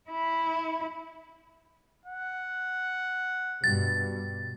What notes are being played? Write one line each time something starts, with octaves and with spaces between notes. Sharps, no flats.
E4
F#5
G2 B2 A6